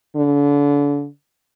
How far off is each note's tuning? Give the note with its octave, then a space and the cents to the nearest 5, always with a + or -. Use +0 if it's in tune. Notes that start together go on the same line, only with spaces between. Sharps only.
D3 -35